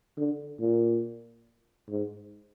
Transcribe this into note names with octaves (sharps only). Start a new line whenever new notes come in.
D3
A#2
G#2